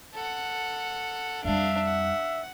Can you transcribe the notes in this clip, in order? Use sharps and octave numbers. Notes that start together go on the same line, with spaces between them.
A4 F#5
F2 G3 D4 E5 F5
F#5